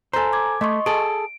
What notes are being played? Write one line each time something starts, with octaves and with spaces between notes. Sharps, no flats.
A4 C5 G#5 A#5
D6 G#6
A3 D#5 C6 C#6
G#4 A4 D7